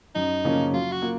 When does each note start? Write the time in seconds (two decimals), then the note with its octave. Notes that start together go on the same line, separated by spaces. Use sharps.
0.15 F#2 D#4
0.44 C#3 F3 A#3 C#4
0.72 F#3 F4
0.92 F#4
1.02 A#3 F4